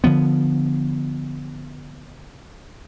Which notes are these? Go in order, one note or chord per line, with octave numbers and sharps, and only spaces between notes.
D3 F3 B3